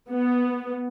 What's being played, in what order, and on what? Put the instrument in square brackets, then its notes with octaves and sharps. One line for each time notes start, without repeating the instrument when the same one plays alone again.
[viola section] B3